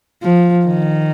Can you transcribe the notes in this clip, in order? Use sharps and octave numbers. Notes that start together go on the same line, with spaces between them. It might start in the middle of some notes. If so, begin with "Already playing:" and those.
F3
D#3